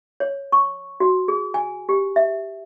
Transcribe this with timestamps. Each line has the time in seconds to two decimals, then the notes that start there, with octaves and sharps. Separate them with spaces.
0.20 C#5
0.52 C#6
1.00 F#4
1.28 G#4
1.54 G#5
1.89 G4
2.16 E5